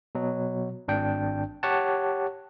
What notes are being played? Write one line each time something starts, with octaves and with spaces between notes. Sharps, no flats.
B2 F#3
G#1 D4 G5
G4 C#5 F#5 A5